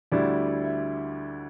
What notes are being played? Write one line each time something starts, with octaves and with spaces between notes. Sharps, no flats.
D2 D3 G3 E4 D5
E5